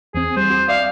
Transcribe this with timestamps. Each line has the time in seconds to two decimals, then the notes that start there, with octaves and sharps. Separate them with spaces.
0.15 E2 C4 G#4
0.37 G3 C4 C5
0.50 F#4
0.69 D5 E5 F5 D6